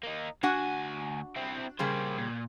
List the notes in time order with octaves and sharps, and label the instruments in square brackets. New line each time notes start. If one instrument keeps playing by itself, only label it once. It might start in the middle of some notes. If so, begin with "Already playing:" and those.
[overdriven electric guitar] A#3 D#4
[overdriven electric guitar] D2 G#5 [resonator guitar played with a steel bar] D4 F#4 F#5
[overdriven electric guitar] C4 E4
[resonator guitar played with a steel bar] C#3 G3 G#4 [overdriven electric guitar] A#3 C5
[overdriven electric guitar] A#2